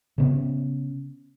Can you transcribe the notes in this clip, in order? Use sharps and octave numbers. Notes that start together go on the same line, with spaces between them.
C#3 B3 C#4